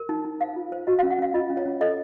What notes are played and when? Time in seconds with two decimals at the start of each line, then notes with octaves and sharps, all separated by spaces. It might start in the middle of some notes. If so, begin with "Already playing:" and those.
Already playing: A#4
0.09 D#4
0.25 D#4
0.40 C5 F5
0.56 F4
0.72 C5
0.87 F#4 D#5
0.99 C#4 F5
1.10 F#5
1.19 C#4 F5
1.34 F4 D#5
1.50 C#4
1.57 C#5
1.66 C#4
1.81 A4 D#5